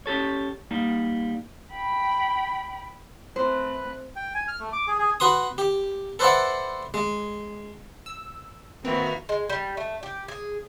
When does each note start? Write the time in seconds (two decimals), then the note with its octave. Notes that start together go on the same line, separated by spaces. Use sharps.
0.06 C#4 G4 A4 C#5
0.71 G3 A#3 D#4
1.72 G5 B5
3.36 A3 C4 B4 C5 B5 F#6
4.16 G5
4.35 G#5
4.48 F6
4.60 A3
4.73 D6
4.87 G#4
4.99 G#4
5.20 F#4 B4 C6 D#6
5.58 G4
6.19 A4 B4 C5 D5 E5 F#5
6.94 G#3
8.06 E6
8.85 D#3 A#3 C4 F#4 B4 E5 F6
9.29 G#3
9.49 G3
9.77 A3
10.03 G4
10.28 G#4